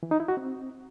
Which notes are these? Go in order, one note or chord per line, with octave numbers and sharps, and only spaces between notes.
E3
D#4
E4
F#4
C4